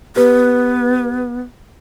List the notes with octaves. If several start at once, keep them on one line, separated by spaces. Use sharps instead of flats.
B3 G4 B4